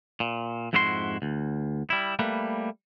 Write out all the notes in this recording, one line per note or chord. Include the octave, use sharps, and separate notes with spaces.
A#2
F2 G#2 E4 F#4 G4 C6
D2
G3 E4
G3 A3 A#3 B4